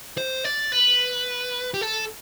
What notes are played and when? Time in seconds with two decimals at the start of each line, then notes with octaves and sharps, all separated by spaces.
0.18 C5
0.44 D5
0.72 B4
1.74 G4
1.81 A4